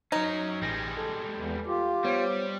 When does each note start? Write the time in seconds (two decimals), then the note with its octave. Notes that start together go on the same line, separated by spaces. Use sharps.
0.12 F#3 C#4 D#4
0.62 A1 G3 G#3 A#6
0.97 A4
1.35 E2
1.67 F4 G4
2.04 G3 B3 C5 C#5